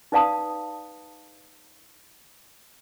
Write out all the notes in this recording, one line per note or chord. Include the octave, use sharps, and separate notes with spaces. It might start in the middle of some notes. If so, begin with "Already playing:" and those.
D#4 B4 D5 F5 A5 D#6